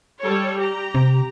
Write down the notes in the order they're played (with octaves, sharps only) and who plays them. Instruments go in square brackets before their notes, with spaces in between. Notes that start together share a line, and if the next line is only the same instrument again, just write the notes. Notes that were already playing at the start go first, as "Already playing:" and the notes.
[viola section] G3 A4 C#5
G4 A#5
[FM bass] C3